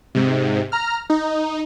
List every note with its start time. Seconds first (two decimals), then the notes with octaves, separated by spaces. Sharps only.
0.15 G#2 C3
0.72 A#5 F6
1.10 D#4